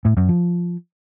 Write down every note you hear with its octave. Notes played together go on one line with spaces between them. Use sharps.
A2
F#2
F3